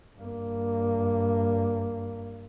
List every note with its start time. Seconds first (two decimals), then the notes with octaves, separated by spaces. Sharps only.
0.18 G2 A#3